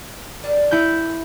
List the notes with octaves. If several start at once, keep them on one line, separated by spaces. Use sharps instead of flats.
G3 D4 A#4
E4 G6